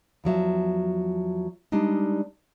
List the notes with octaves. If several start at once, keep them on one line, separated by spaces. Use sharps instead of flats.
E2 F3 F#3 E5
G3 G#3 D4 D#4